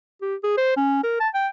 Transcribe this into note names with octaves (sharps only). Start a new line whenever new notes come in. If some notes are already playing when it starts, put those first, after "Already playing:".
G4
G#4
C5
C#4
A#4
A5
G5